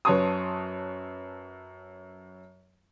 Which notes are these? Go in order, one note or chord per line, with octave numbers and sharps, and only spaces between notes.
F#2 B4 C#5 A5 C6 D#6